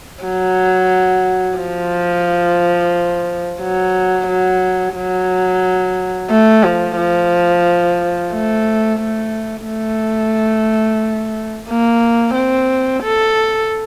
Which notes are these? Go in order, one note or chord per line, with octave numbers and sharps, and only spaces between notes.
F#3
F3
F#3
F#3
F#3
A3
F3
F3
A3
A3
A3
A#3
C4
A4